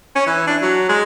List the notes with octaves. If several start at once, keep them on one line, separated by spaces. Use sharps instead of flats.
C#4
E3
D4
F#3
G#3